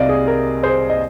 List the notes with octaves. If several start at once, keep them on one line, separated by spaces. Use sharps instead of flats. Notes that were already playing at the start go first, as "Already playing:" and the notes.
Already playing: C2 C3 G3 C4 D5 D#5 F5
G#4
A#4
G#4 C5
D#5